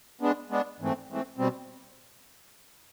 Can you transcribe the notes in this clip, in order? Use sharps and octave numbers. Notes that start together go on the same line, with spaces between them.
G#3 B3 D4
G#3 B3 D4
G#2 E3 A3 C4
G#2 E3 A3 C4
B2 G3 C4